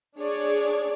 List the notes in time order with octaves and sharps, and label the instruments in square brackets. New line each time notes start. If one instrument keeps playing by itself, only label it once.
[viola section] D4 G#4 C#5 D5